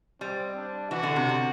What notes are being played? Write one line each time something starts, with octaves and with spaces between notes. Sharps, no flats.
G3 C4
D4
E3 F#4
D3
C3
D3